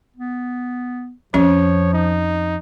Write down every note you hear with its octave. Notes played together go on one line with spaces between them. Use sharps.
B3
F2 F3 C#4 C#5
D#4